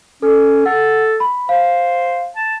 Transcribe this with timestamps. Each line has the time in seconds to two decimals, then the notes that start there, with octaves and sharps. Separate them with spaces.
0.22 C#4 A4
0.66 A4 F#5
1.20 B5
1.49 C5 F5
2.36 A5